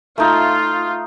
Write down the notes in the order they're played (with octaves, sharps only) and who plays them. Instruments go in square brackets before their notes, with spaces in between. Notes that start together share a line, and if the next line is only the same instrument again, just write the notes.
[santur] A3 D#4 [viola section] F4